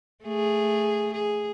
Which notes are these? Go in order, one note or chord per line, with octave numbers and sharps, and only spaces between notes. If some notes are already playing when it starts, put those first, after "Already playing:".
A3 G#4
G#4